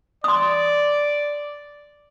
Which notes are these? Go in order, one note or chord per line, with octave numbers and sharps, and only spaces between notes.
D5 C6 D#6